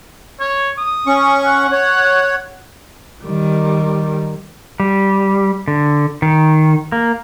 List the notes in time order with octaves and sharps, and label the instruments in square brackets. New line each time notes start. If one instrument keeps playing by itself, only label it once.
[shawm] C#5
D#6
[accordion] C#4 C#6
[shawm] F#5
[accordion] C#5
[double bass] D#3 G3
[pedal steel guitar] G3
D3
D#3
A#3